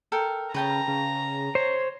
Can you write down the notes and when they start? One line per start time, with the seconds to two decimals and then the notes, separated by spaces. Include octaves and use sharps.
0.12 A4 A#4 G5
0.54 C#3 B4 G5 A5 A#5
0.88 C#3
1.55 C5 C#5